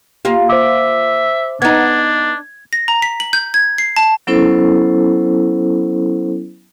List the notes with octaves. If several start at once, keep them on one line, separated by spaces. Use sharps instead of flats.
A#3 F4 G4
C5 E5 D6
B3 D4 D#4 G#6
A#6
A#5
B6
F#7
G6
G#6
C7
A5
F#3 B3 C#4 E4 A4 C5